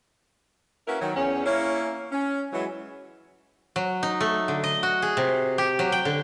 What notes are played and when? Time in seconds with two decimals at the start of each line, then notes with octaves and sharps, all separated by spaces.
0.88 A#3 C#4 E4 F#4 A#4 B4
1.01 D#3 F#3
1.17 E2 C#4
1.46 A#3 C#4 E4
2.12 C#4
2.52 E3 F#3 G#3
3.76 F#3
4.03 D#4
4.21 A3
4.48 D3
4.64 D#5
4.83 F#4
5.02 G#4
5.17 C3
5.58 G4
5.79 F#3
5.92 G5
6.05 D3